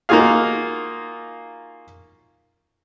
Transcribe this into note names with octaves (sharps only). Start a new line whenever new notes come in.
A#3 D#4 F4 F#4 G#4 F5